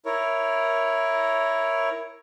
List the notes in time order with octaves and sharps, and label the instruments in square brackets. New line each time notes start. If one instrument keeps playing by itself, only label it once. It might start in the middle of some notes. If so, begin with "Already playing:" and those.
[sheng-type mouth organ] E4 A#4 C#5